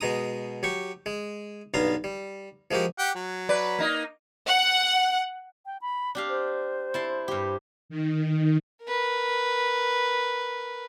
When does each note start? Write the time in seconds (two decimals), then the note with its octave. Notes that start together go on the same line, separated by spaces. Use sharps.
0.01 B2 G#3 A#5 D#6
0.63 F#3 G4 C#6
1.06 G#3
1.74 B1 G2 B3 F5 A#5
2.04 G3
2.71 F3 G#3 A#3 F#4 G4
2.98 G4 F#5 G5
3.15 F#3
3.49 B4 D5
3.79 A#3 D#4
4.48 F#5
5.66 G5
5.81 B5
6.15 D4 G4 F5
6.29 C5
6.94 E4 A5 C6
7.28 G2 G4
7.89 D#3
8.83 A#4 B4